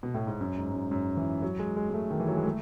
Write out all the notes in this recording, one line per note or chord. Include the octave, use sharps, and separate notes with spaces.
B2
A2
G#2
F#2
G#2
F#2
F#2
E3
F#3
G#3
G#3
G#3
A3
D#3
E3
F#3
G#3
A3